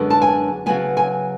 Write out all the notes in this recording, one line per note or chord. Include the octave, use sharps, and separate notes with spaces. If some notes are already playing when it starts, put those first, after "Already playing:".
Already playing: F#2 D3 G#3 B3
A5
G#5
C#3 F#3 B3 G#5
G#5